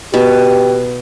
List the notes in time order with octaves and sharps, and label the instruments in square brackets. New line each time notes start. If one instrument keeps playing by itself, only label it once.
[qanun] B2 [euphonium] G4